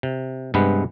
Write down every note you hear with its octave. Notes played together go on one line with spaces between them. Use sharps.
C3
G2 C3 G#3 B3 B4